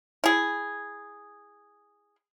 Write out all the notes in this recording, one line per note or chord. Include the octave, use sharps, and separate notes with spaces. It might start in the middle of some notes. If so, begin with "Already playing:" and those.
E4 G#4